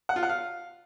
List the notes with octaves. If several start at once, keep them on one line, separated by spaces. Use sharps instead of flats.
F#5
F4
F#5
F5